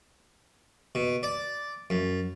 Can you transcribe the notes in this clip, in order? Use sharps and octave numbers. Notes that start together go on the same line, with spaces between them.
B2
D5
F#2